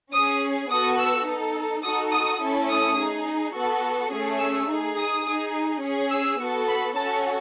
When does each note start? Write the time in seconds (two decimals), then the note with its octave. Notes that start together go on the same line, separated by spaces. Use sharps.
0.12 C#4 G#4 D#6
0.70 B3 F#4 A4 D#6
0.98 E6
1.26 D#4 A4
1.83 D#4 F#4 A4 D#6
2.11 D#6
2.40 A3 C#4 E4 A4
2.69 D#6
2.96 D#4 G#4
3.54 B3 F#4 A4
4.11 A3 C#4 G#4
4.39 E6
4.68 D#4 G#4
4.97 D#6
5.25 D#4 G#4
5.82 C#4 G#4
6.10 E6
6.39 B3 F#4 A4
6.67 B5
6.96 C#4 F#4 A4 A5